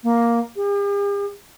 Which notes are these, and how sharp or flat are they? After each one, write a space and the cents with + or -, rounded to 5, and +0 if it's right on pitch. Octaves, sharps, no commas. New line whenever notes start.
A#3 +5
G4 +45